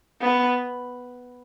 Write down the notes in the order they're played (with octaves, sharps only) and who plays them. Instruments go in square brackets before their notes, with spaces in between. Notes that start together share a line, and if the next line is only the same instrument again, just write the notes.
[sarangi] B3